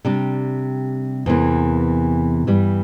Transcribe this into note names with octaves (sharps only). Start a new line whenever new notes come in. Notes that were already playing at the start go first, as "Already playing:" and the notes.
C3 G3 D4 G4
E2 C3 E3 A#3
G2 E3 G3